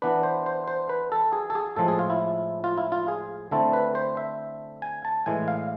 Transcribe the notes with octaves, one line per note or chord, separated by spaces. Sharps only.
E3 B3 D4 B4
C5
C5
C5
B4
A4
G#4
A4
G#4
A2 F3 G#3 A4
G#4
F4
E4
F4
E4
F4
G#4
D3 A3 C4 E4 A4
B4
C5
E5
G#5
A5
A2 E3 G#3 G#5
F5